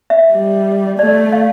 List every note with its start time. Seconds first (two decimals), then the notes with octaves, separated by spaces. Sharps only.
0.10 E5
0.33 G3
0.99 A3 D5
1.32 F5